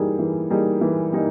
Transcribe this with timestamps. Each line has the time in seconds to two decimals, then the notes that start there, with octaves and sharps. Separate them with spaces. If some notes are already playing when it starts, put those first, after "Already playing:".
Already playing: E3 G3 A#3 D#4 G#4
0.19 E3
0.50 G3 A#3 D#4 G#4
0.81 E3
1.13 G3 A#3 D#4